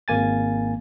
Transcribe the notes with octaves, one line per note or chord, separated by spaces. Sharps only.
G#1 A#3 G#5 A6